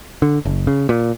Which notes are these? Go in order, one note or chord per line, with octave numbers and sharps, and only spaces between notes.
D3
F#1
C#3
A#2